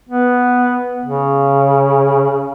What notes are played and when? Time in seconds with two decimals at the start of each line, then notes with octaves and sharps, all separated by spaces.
0.09 B3
1.05 C#3